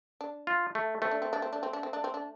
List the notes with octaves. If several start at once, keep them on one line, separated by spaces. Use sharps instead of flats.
D4
F4
A3
A3 C4
D4
C4
D4
C4
D4
C4
D4
C4
D4
C4
D4